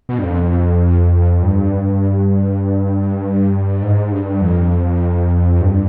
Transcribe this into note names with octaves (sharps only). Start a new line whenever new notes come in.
B2
G2
F2
G2
G#2
G2
F2
G2